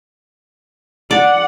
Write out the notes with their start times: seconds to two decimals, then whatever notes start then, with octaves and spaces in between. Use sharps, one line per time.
1.11 D5 F#5